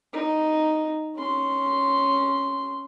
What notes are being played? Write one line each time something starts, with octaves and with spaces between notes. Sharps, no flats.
D#4
C#4 C6